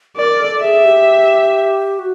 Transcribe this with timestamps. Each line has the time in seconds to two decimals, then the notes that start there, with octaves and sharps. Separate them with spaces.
0.16 A#4 D5
0.40 A4
0.62 G#4 E5
0.84 G4
1.99 F#4